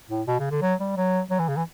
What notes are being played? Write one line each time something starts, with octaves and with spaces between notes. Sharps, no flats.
A2
B2
C#3
D3
F#3
G3
F#3
F#3
E3
C#3
E3